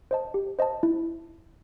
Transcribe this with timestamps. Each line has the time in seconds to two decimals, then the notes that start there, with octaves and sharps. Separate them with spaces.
0.11 C5 D#5 A5
0.34 G4
0.59 C5 D#5 A5
0.83 E4